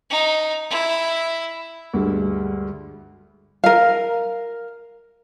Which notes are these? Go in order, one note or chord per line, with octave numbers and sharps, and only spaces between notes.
D#4
E4
D2 G2 G#3
A#4 F5